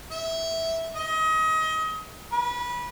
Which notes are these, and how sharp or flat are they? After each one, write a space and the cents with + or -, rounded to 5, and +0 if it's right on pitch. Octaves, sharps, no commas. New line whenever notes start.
E5 -10
D#5 +30
B4 -20